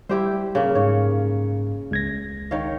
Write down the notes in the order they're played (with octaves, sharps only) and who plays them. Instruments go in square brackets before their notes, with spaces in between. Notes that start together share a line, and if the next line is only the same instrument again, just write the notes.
[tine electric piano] G3 [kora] E4 G4 C5
[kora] C#3 A#3
[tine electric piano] G#2 [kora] C#5
[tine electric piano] C#2 G#6 A#6
[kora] D#3 C#5 F5